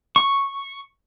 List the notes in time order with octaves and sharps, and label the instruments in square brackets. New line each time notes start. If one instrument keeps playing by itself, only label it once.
[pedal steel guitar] C#6